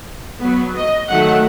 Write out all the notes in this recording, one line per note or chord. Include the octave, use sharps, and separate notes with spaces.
F#3 B3
D#5
D#3 F#3 A3 F#5